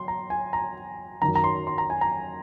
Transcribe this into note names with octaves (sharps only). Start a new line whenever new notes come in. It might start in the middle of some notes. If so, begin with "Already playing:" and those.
Already playing: F#3 C6
A#5
G#5
A#5
F#2 D#3 F#3 A#5
A#5
C6
C6
A#5
G#5
A#5